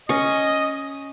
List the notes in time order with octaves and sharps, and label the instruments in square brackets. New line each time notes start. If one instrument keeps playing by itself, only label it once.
[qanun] C#4 C#6 [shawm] D#5